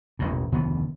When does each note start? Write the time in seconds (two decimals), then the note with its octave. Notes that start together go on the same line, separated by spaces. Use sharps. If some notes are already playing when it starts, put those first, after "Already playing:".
0.19 E1 A1 A2
0.52 F1 D2 D#3 B3